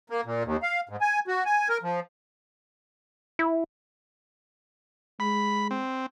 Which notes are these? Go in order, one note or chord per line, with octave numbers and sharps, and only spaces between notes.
A#3
A#2
D#2
F5
G#2
G#5
F#4
G#5
A#4
F3
E4
G#3 B5
C4